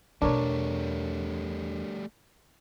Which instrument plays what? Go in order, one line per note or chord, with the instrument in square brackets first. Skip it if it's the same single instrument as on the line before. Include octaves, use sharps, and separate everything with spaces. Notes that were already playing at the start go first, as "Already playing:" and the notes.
[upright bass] E2 B2 [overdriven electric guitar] G3 A3 [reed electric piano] D4 A#4 C#5